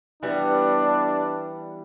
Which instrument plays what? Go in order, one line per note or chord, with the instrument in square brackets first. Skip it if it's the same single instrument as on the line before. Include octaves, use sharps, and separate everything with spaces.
[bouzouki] E3 G3 B3 [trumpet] D4